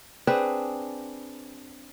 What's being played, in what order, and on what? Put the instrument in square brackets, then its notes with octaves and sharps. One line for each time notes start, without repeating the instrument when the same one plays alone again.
[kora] C4 D4 G#4 B4